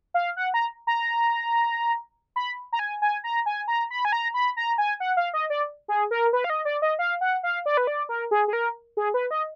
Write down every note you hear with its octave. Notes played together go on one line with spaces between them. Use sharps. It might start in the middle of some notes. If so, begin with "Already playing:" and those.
F5
F#5
A#5
A#5
B5
A#5
G#5
G#5
A#5
G#5
A#5
B5
G#5
A#5
B5
A#5
G#5
F#5
F5
D#5
D5
G#4
A#4
B4
F5
D#5
D5
D#5
F5
F#5
F5
D5
B4
D5
A#4
G#4
G#4
A#4
G#4
B4
D#5